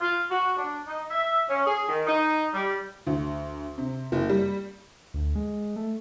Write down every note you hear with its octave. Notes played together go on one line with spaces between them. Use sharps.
F4
F#4
D4
D#4
E5
C#4
G#4
D#3
D#4
G3
D2
C3
F#1
G3
D2
G#3
A3